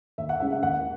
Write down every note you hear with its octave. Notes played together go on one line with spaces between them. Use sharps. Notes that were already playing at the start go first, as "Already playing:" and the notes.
D#2 E5
F#5
C#3 G#3 C#4 E4 E5
F#5
D#2 F#5